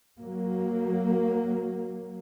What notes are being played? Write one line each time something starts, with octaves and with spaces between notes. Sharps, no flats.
F#3 A#3